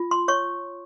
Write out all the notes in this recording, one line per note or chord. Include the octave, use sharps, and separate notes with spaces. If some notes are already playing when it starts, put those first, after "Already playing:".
Already playing: F4
C6
C#5 C#6